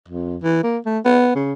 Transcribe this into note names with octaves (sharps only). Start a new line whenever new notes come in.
F2
E3
A#3
A3
B3
C#3